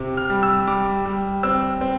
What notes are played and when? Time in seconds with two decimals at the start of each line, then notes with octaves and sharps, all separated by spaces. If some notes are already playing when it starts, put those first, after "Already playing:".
Already playing: C3 C4
0.17 F6
0.30 G3
0.43 E6
0.67 G3 D6
1.05 G3
1.43 C4 E6
1.81 C4